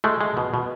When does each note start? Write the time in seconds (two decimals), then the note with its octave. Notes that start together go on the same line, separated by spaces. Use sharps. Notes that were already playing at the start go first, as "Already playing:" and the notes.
0.04 G#3 A3
0.21 G#3
0.37 B2
0.54 B2